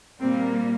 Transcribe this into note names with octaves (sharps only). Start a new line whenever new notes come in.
A#2 G3 A#3 C4